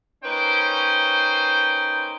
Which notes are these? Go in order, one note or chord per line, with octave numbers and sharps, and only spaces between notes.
A#3 C#4 D#4 B4 C5 G5